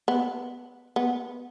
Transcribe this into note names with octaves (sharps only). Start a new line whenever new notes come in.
B3
B3